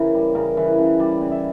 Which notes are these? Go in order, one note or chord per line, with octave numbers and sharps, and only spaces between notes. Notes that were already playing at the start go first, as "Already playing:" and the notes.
Already playing: C#3 E3 A#4 C#5
G3
C#3 A#4
E3
B4
C#3
G3 D5
C#3
E5